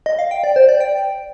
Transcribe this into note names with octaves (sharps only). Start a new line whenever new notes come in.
D#5
F5
G5
D5
C5
D5
G5